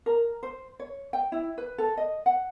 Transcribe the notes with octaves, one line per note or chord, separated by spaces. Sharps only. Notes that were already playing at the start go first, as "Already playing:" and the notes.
A#4
C5
C#5
G5
E4
B4
A4
D#5
F#5